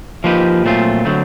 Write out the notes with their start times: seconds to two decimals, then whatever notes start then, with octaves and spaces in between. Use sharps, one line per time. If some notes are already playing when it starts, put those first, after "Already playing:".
0.24 F3 A#3 D#4 G4 B4
0.65 A#2 F#3 A3 C4 F4
1.05 D3 F#3 A3 C4